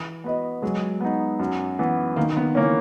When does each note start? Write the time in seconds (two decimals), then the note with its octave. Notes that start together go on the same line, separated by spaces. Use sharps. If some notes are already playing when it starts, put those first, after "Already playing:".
Already playing: E3
0.24 B3 F#4 B4 D#5
0.62 F#3 G#3
1.01 B3 D#4
1.40 F#2
1.79 E3 B3
2.16 D#3 A#3
2.37 B3
2.55 E3 A#3 C#4